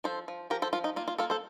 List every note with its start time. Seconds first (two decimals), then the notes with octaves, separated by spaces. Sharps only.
0.04 F3 A4 C5
0.28 F3
0.50 F3 G4 A#4
0.62 A4 C5
0.73 F3 F4
0.84 D#4
0.96 A#3 F4
1.08 F4
1.18 A#3 F4 A4
1.30 A4 C5